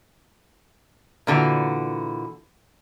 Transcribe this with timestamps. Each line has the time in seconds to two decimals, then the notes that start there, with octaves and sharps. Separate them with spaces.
1.27 A#2 D3 E3 F#4